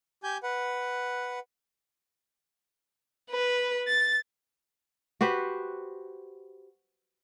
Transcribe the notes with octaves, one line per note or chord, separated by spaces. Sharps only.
G4 G#5 G6
B4 F#5
B4
A6
F#4 G4 B4 C5